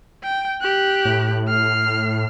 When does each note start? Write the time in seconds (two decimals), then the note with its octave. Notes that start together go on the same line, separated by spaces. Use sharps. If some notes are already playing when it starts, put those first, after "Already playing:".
0.23 G5
0.61 G4 F#6
1.05 A2
1.48 F6 C7